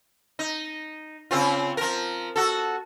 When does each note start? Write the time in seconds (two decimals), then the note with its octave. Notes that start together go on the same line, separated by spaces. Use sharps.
0.39 D#4
1.31 C#3 C4 F4
1.77 F3 A#4
2.36 F#4 A4